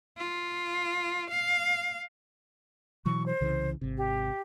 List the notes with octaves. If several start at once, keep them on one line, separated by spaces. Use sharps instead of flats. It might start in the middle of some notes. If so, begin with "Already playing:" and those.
F4
F5
B2 E3 F#3 C#6
C5
C2 C#3 E3
G#1 C3
G4